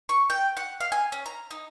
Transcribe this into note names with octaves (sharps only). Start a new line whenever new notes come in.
C#6
G5
F#5
F5
G#5
C#4
A#5
D#4